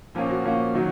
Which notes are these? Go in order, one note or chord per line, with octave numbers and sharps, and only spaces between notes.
A#2 F3 A#3 C#4 F4
F#4
A#2 F3 A#3 C#4
D#3 F#3